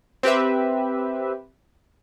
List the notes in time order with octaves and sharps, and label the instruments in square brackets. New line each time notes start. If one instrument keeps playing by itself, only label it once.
[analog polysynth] C4 G4 B4 E5